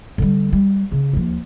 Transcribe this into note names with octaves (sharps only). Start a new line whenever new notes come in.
D3 G3
G3
C#3
D#2 F3